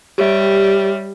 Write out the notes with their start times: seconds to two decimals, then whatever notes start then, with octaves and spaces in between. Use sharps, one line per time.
0.18 G3 G4 C#5 E5